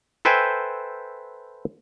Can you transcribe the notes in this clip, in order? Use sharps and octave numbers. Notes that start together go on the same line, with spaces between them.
A4 B4 C5 E5 G5 G#5